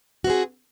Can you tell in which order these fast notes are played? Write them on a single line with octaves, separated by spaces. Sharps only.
F#4 C4 G#4